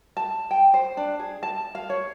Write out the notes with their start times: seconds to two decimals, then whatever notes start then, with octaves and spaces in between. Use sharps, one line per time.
0.17 A5
0.51 G5
0.74 C5
0.97 D4
1.19 G#4
1.43 A5
1.75 F5
1.90 C#5